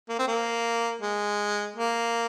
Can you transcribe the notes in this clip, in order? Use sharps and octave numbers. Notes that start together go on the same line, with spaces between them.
A#3
C4
A#3
G#3
A#3